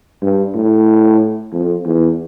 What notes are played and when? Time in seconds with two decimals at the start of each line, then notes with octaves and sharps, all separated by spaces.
0.22 G2
0.54 A2
1.53 F2
1.86 E2